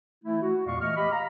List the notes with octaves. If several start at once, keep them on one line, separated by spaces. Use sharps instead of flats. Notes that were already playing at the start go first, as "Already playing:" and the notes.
E3 A3 E4
F#4
E2 A#2 G#3 D5 F5 C#6
E3 A3 D#5 C#6 F6
G4 D#5 B5
F5 A#5